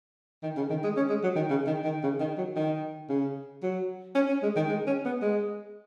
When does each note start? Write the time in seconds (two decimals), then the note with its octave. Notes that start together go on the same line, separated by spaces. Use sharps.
0.43 D#3
0.57 C#3
0.70 D#3
0.84 G#3
0.97 C#4
1.09 G#3
1.23 F#3
1.36 D#3
1.50 C#3
1.67 D#3
1.84 D#3
2.03 C#3
2.20 D#3
2.38 F#3
2.56 D#3
3.09 C#3
3.63 F#3
4.15 C#4
4.29 C#4
4.43 G#3
4.56 D#3
4.69 G#3
4.87 C#4
5.05 B3
5.22 G#3